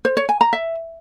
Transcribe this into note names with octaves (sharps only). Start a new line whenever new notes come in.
C5
C#5
G#5
A#5
E5